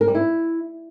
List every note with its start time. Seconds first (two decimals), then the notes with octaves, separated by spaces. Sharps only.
0.01 A#4
0.08 G3
0.15 E4